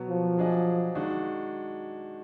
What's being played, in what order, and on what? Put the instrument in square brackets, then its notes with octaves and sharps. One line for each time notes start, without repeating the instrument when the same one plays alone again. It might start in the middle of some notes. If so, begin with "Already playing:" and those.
Already playing: [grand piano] B2 F#3 B3
[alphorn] F3
[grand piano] F#3 D4 G#4 D#5
D#3 G#3 D4 F#4